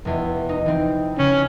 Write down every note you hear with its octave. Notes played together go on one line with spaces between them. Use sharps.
F1 E2
D#4
E3 C4
C#3 C#4